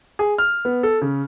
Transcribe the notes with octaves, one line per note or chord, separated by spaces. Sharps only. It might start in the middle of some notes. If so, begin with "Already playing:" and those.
G#4
F6
B3
A4
C#3